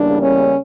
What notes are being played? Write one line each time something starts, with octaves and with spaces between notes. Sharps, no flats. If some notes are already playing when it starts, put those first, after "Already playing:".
Already playing: E2 C#3 G3 A#3 D4
C#4